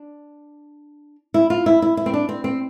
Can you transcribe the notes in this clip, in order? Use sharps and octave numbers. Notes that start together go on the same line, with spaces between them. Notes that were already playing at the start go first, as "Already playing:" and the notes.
Already playing: D4
E4
F4
E4
E4
E4
C4
D4
C4
C4